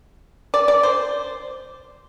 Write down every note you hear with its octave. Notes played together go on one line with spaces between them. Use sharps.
D5
D5
C5